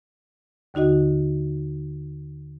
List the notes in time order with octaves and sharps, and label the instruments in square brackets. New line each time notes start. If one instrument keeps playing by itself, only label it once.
[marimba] D#2 D3 D#4 F#4 D#5